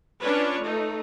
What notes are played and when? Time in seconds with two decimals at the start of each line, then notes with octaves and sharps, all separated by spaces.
0.19 C#4 D4 F4 B4 C#5
0.61 A3 D#4